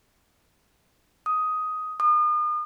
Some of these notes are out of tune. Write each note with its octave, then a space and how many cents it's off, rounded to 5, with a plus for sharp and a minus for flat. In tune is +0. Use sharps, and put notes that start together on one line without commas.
D#6 +10
D#6 -40